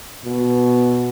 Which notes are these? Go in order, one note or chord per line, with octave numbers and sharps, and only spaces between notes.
B2